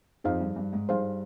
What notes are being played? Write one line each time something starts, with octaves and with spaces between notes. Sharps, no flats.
F2 D#4 G#4 C5 F5
G2
G2
G#2
G2 D#4 G#4 C5 F5